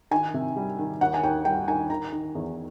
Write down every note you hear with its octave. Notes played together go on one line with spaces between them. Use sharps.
D#3 G#5
C3
G3
D#3
D#2 F#5
G#5
D#2 G5
G3 G5
D#3 G#5
D#3 A#5
D#3
E2